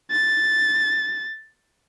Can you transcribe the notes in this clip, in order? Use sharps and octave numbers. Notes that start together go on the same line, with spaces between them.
A6